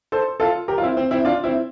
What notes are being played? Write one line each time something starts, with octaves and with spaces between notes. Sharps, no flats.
A4 C5
F4 A4
G4 A#4
F4
C4 E4
C4
C4 E4
D4 F4
C4 E4